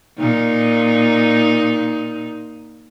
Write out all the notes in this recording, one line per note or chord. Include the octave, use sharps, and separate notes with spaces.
A#2 D#4